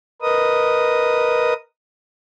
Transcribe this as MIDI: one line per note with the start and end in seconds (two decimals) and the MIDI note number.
0.22 1.53 70
0.22 1.53 71
0.22 1.53 75
0.22 1.53 87